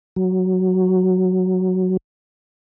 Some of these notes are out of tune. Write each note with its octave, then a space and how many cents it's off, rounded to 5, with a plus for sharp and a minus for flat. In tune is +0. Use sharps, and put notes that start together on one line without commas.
F#3 +0